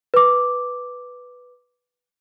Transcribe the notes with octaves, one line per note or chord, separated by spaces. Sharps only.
B4 D6